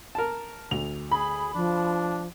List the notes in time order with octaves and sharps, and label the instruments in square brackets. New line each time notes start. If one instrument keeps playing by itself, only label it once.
[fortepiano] A#4 A5
[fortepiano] D2 [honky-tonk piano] F7
[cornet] G#4 [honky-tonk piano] B5
[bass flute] F3 [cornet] D4